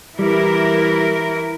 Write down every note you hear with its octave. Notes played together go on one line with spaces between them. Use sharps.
E3 G3 E4 A#4